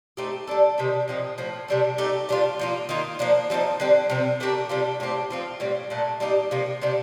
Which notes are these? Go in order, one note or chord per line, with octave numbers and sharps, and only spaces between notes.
A3 C4 D#4 G4
G3 D4 A4
C3 D#3 G3 D4
A#2 F3 C4 D#4
A2 F3 C4
C3 G3 D4 A4
A3 D#4 G4
C3 G3 D4 F4
F3 A#3 F4
D#3 A#3 F4
F3 A#3 D4
F3 A3 C4 D#4
D3 G3 C4
C3 F3 C4
A3 D4 G4 A#4
C3 G3 D4 F4
A2 A3 C4 G4
F3 C4 F4
A2 G3 C4
A#2 A3 D4
G3 A#3 D#4 G4
C3 F3 A#3
C3 G3 D4 G4